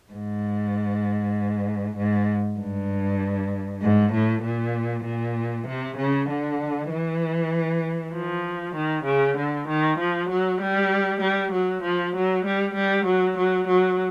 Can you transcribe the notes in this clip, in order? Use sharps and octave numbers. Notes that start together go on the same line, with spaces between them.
G#2
G#2
G2
G#2
A2
A#2
A#2
C3
C#3
D3
E3
F3
D#3
C#3
D3
D#3
F3
F#3
G3
G3
F#3
F3
F#3
G3
G3
F#3
F#3
F#3